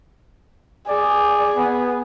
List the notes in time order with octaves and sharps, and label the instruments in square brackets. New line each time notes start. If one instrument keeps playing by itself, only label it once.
[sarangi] G#4 [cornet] D5
[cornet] B3